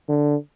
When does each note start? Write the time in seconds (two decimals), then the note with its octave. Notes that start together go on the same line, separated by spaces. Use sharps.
0.09 D3